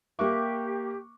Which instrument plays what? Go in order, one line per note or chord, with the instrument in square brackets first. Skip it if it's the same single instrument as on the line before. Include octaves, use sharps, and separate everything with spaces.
[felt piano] A#3 A#4 E5 [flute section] G4 [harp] C#6 D6 F#6